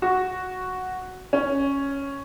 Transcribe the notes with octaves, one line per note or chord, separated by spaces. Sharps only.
F#4
C#4